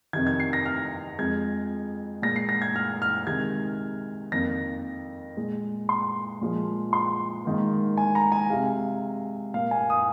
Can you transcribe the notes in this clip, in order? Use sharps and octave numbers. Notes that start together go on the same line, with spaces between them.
F2 C3 D#3 G#6
G#6
C7
A#6
F6
F2 F3 G#3 G#6
A#2 G#3 A#6
C7
A#6
G#6
F6
F6
C3 D#3 G#3 G#6
F2 D#3 A#3 A#6
A#2 G#3
C6
A#2 F3 G#3
C6
G#2 D#3 A#3
G#5
A#5
G#5
C3 G#3 F5
A#2 A#3 F5
G#5
D#6